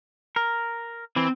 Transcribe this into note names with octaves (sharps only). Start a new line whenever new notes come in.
A#4
E3 C4